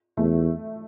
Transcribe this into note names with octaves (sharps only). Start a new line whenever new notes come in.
E2 A3